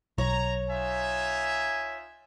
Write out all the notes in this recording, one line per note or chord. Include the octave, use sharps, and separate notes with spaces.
B1 C#5 A#5
D#4 F4 E5 G#5